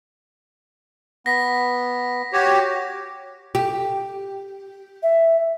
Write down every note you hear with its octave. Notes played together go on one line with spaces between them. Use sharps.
B3 A#6 B6
F#4 G4 C#5
G4
E5